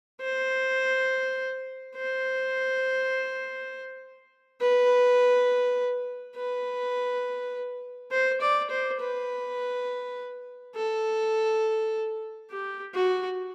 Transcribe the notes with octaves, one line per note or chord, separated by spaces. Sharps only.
C5
C5
B4
B4
C5
D5
C5
B4
A4
G4
F#4